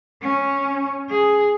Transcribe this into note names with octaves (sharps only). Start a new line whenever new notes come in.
C#4
G#4